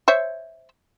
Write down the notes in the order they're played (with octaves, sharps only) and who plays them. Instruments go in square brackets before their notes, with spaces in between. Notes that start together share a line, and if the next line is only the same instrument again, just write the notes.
[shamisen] C5 C#5 E5